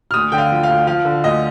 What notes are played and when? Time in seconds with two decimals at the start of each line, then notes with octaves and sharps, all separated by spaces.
0.11 F6
0.14 D2 D#6
0.32 D3 G5
0.38 F5
0.51 F3
0.63 F5
0.69 D2
0.87 F3 F5
1.05 D3
1.24 D2 D#5